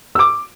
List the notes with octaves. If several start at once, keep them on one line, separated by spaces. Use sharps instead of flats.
E6
D6